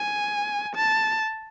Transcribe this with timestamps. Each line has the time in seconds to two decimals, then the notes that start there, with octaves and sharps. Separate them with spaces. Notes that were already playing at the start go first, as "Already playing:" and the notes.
Already playing: G#5
0.75 A5